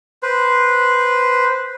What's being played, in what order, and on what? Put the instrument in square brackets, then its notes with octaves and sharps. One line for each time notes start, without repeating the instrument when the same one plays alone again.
[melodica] B4 C5